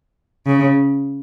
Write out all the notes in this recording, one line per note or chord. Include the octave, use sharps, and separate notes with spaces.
C#3